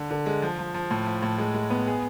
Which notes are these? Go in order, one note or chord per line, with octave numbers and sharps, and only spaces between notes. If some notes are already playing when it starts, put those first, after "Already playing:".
Already playing: D3
D3
G#3
F3
F3
F3
A2
F3
A2
G#3
G#3
B3
G#4